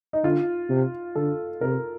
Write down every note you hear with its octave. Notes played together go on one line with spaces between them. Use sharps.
D#4
D3 F4
C3
D3 A4
C3 A#4